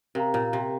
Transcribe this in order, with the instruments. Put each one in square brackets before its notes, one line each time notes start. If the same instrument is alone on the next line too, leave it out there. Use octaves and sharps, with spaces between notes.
[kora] C3 [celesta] A#4 F5 A#5
[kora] A#2
C3